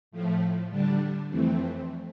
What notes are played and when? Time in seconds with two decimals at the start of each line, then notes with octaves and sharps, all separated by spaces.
0.11 A2 F3 A3
0.69 D3 G3 D4
1.29 F2 E3 A3 C4